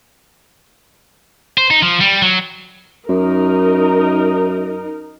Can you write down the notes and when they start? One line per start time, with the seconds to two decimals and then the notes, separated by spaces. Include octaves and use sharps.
1.58 C5
1.71 D#4
1.82 F3
2.01 G3
2.22 F#3
3.09 F#2 D#4 A#4